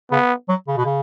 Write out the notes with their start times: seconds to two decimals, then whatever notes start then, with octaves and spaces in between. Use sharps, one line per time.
0.11 C#3 B3
0.49 F#3
0.68 C#3
0.77 B2
0.85 C#3